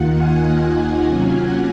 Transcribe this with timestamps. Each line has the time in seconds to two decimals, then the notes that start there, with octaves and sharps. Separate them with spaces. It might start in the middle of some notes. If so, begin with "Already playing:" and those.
Already playing: D#2 D#3 A#3 F4 F#5
0.15 G#5
0.44 F#5
0.75 G#5
1.05 C3 F#3 A#3 C#4 F4
1.35 F#5